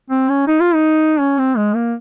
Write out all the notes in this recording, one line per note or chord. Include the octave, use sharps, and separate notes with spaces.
C4
C#4
D#4
F4
D#4
C#4
C4
G#3
A#3